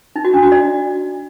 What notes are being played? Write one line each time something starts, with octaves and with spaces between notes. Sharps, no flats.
D#4
F#4
D4
F#4
D5